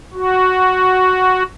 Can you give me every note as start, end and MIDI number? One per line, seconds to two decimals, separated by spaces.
0.13 1.43 66